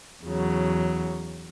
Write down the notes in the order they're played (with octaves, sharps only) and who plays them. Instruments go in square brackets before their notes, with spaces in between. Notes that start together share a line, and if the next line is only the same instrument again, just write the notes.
[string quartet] E2 C#3 F#3